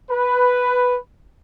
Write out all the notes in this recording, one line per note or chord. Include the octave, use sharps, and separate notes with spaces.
B4